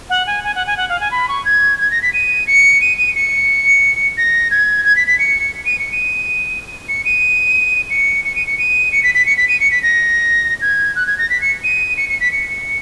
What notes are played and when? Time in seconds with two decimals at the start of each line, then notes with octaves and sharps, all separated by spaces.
0.10 F#5
0.27 G#5
0.44 G#5
0.55 F#5
0.67 G#5
0.77 F#5
0.89 F5
1.01 G#5
1.11 B5
1.29 C#6
1.45 G#6
1.79 G#6
1.91 A#6
2.02 B6
2.13 D#7
2.47 C#7
2.81 D#7
2.98 D#7
3.15 C#7
4.17 A#6
4.51 G#6
4.85 G#6
4.96 B6
5.07 B6
5.19 C#7
5.66 D#7
5.79 C#7
5.92 D#7
6.89 C#7
7.05 D#7
7.90 C#7
8.25 C#7
8.36 D#7
8.47 C#7
8.59 D#7
8.92 C#7
9.03 B6
9.15 B6
9.26 C#7
9.37 B6
9.49 D#7
9.60 C#7
9.71 B6
9.83 A#6
10.62 G#6
10.96 F#6
11.07 G#6
11.18 A#6
11.30 B6
11.41 C#7
11.64 D#7
11.97 C#7
12.09 C#7
12.20 B6
12.32 C#7